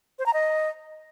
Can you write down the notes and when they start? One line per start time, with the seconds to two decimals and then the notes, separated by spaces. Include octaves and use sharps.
0.19 C5
0.26 A#5
0.33 D#5